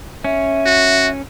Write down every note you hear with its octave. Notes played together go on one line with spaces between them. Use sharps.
C#4 E5
F#4